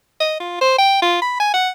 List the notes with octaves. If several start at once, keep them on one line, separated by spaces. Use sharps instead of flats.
D#5
F4
C5
G5
F4
B5
G#5
F#5